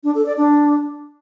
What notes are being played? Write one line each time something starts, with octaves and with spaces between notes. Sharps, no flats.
D4
A4
D5
D4